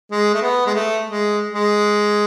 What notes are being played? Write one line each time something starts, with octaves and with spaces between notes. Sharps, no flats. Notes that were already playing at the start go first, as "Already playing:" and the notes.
G#3
A3
B3
G#3
A3
G#3
G#3